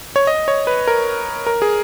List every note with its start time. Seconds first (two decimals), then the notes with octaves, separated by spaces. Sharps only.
0.16 C#5
0.27 D#5
0.48 C#5
0.67 B4
0.88 A#4
1.47 A#4
1.62 G#4